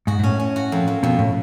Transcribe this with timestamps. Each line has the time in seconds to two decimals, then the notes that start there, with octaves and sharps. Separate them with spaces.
0.07 G#2 F#4
0.19 G#2
0.23 A2 C#4
0.40 C#4
0.56 F#4
0.72 F2
0.88 F2
1.03 F2 B2
1.19 A2